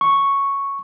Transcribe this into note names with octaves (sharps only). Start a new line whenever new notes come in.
C#6